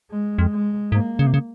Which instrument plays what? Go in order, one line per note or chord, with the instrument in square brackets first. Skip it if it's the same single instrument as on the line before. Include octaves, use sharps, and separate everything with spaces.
[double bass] G#3
[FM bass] F2
[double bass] G#3
[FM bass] G#2 [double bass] A#3
[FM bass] C#3
C3
C#3